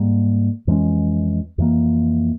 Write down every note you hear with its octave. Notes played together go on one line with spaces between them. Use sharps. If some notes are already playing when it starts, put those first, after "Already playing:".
Already playing: G#2 G3 A#3
F2 E3 G#3 C#4
F2 E3 A#3